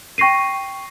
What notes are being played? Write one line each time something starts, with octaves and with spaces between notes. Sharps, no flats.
G5 C#6 A#6 C7 D#7